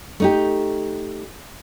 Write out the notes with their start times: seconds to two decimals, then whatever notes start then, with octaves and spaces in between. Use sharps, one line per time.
0.20 A3 D#4 G4